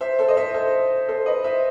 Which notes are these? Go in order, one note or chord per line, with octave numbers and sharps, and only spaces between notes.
C5 E5
A4 C5
D#5
C5 E5
A4 C5
A4 C5
B4 D#5
C5 E5